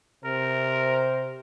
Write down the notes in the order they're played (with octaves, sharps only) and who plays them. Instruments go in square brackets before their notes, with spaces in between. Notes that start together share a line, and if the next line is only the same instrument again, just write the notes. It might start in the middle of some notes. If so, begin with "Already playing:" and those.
[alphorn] C3 [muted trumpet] A#4 [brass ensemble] C5